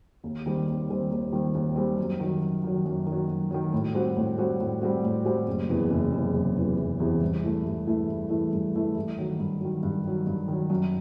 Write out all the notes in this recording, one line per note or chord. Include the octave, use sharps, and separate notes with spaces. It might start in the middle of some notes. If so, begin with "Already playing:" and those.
D#2
D#3 G3 C4
D#2
D#3 G3 C4
D#2
D#3 G3 C4
D#2
D#3 G3 C4
F#2
D#3 F#3
F#2
D#3 F#3
F#2
D#3
F#3
F#2
D#3 F#3
A2
G3 C4 F#4
A2
G3 C4 F#4
A2
G3 C4 F#4
A2
G3 C4 F#4
F#1
E2 C3 E3
F#1
E2 C3 E3
F#1
E2 C3 E3
F#1
E2 C3 E3
G2
E3 A3 E4
G2
E3 A3 E4
G2
E3 A3 E4
G2
E3 A3 E4
G2
D#3 F#3
G2
D#3 F#3
G2
D#3 F#3
G2
D#3 F#3
F#2